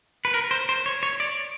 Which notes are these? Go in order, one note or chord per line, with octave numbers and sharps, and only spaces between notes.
B4
A#4
C5
C5
C#5
C#5
D5